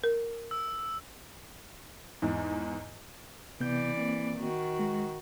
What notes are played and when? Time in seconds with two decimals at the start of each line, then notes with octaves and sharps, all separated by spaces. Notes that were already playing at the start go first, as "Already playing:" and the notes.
0.04 A#4
0.51 E6
2.22 E2 G#2
3.60 C3 E3 B3 D5 G6
3.97 A#3 C4
4.38 D#3 F#4
4.79 G#3